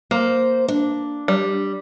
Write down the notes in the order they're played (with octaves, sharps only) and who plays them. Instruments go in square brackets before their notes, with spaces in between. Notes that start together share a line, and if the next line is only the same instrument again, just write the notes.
[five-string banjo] A#3 [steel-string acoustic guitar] C5
[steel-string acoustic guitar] D4
[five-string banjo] G3